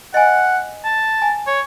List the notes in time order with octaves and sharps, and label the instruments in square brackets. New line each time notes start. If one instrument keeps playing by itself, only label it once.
[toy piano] D#5 G#5 [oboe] F#5
[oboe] A5
[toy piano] G#5
[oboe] C#5